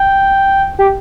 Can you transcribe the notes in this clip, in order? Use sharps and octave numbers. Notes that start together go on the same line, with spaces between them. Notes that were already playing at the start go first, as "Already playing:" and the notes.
Already playing: G5
G4